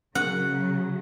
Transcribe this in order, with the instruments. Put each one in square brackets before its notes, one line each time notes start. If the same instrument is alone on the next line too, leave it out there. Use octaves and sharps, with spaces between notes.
[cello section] C#3 F#3 [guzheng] F#5